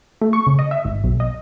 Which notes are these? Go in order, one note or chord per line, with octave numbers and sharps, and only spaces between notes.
A3
C#6
C#3
D#5
E5
G#1
B1
D#5